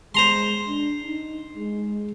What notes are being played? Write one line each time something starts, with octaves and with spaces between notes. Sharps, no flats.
G#3 C5 A#5 C6
D4
D#4
G#3